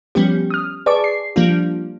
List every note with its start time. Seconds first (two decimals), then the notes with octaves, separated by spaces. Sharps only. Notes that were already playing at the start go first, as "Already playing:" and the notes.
0.15 F3 G3 B3 C#4 G4
0.50 D#6 F6
0.86 G#4 B4 D5 A5 C#6 D6
1.04 C7
1.36 F3 G3 A#3 D4 F4